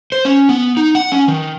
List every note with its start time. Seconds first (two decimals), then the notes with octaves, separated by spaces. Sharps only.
0.12 C5
0.25 C#4
0.49 B3
0.77 D#4
0.95 F#5
1.12 C#4
1.28 D#3